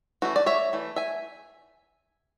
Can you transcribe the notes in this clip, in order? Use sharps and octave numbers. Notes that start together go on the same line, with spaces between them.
E3 A3 C#4 E4 F#4
D5
C#5 E5
E3 A3
E5 G#5